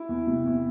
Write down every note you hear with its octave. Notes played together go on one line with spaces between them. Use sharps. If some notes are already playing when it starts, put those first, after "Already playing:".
Already playing: E4
E2
C3
E2